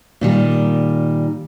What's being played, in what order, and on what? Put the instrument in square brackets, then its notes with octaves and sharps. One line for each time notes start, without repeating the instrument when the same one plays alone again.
[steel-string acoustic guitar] A#2 D#3 G3